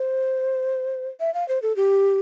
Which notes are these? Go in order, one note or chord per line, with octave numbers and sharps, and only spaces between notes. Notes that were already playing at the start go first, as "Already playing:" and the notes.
Already playing: C5
E5
F5
C5
A4
G4